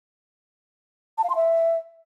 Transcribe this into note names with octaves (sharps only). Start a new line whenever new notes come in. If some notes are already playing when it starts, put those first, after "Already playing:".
A5
F5
C6
E5